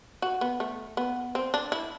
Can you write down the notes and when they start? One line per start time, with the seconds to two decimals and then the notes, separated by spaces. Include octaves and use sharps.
0.22 F#4
0.41 B3
0.60 A3
0.97 B3
1.35 C4
1.54 D4
1.72 E4